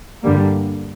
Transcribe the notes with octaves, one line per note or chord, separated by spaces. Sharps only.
G2 D3 G3 A#3